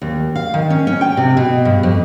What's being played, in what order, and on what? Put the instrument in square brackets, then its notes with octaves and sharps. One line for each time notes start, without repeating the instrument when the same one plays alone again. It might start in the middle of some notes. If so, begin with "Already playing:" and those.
[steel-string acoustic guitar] D#2
F5
D#3
C#4
C#4
G5
C3
B2
G2
F2